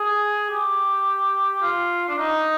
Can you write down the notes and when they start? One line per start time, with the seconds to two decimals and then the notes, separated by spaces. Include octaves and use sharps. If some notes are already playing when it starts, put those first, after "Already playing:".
Already playing: G#4
0.50 G4
1.62 F4
2.09 D4
2.18 D#4